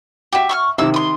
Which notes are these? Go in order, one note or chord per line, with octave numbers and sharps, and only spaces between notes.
F#4 G4 E5
C#6 E6 F6
C3 D#3 A#3 E6
C6 D#6